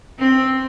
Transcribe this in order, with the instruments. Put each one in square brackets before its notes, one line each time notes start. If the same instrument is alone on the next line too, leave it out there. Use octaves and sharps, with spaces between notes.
[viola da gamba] C4